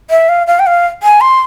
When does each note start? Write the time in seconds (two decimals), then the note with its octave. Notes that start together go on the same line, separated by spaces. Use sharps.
0.10 E5
0.29 F5
0.47 F5
0.59 G5
0.67 F5
1.03 G#5
1.21 C6